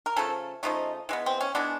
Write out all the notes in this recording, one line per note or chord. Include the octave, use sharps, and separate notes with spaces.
A#4
C#3 F3 A3 A4
C#3 F3 A3 D#4
E3 G#3 B3
C4
C#4
E3 G#3 B3 D4